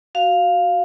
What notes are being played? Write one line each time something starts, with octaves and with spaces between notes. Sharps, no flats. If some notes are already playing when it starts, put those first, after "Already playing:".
F#4 F5